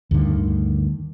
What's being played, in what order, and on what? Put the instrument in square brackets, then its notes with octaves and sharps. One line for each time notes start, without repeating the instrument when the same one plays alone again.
[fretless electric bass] D2 G2 D3 D#3